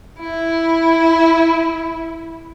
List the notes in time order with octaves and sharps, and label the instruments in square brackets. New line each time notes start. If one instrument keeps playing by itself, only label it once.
[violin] E4